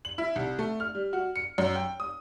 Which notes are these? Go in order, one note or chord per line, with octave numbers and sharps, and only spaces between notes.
F#7
E4
C2
A3
F6
G3
F#4
C#7
F#2
G5
D#6